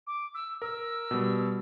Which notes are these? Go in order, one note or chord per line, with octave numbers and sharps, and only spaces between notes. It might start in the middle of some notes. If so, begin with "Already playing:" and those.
D6
E6
A#4 E6
B2 G3